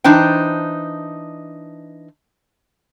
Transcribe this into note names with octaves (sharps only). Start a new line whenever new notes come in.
E3 D4 D#4 C5 G5